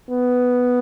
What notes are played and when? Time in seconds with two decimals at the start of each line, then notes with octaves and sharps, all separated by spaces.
0.10 B3